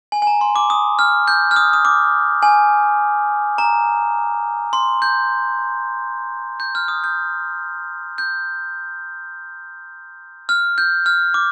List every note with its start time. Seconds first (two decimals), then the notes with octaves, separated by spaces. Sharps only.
0.12 G#5
0.22 G#5
0.27 A#5
0.41 C6
0.56 D6
0.70 D#6
0.99 F6
1.28 G6
1.51 F6
1.56 D#6
1.73 D#6
1.85 D6
2.42 G#5
3.58 A#5
4.73 C6
5.02 G6
6.60 G6
6.75 F6
6.88 D#6
7.04 G6
8.18 G6
10.49 F6
10.78 G6
11.06 F6
11.34 D6